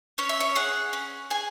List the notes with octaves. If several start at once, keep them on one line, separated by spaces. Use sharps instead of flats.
C#4 C#5
E5
C#5
G#4 F#5
C#4
G#4 G#5